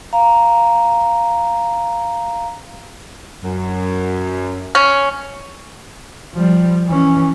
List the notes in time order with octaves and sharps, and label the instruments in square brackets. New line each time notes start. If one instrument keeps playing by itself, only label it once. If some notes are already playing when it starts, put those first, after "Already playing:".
[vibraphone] F5 A#5
[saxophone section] F#2
[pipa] C#4
[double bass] F3 G3
E3 C#4